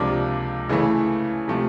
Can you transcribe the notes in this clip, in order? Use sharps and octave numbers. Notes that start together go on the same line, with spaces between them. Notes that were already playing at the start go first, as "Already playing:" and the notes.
Already playing: C#2 C3 F3 A#3 D4
C#3 E3 A3
C3 F3 A3